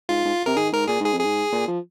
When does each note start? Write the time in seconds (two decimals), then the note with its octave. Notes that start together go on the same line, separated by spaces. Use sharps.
0.09 G#2 F4
0.25 G#2
0.46 C3 A#4
0.56 D#3 G#4
0.72 G#2 A#4
0.88 A#2 G#4
1.00 G#2 G#4
1.13 F2
1.20 G#2 G#4
1.52 A#2
1.68 F3